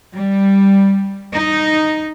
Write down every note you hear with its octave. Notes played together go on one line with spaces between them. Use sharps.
G3
D#4